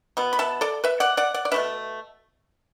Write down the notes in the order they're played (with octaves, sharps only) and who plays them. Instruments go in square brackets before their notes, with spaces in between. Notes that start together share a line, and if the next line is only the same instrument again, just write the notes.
[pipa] B2 B3
B5
E5 A5
A4 D5
B4 E5
D5 F#5
D5 F#5
D5 F#5
D5
B2 A3 D4 B4 E5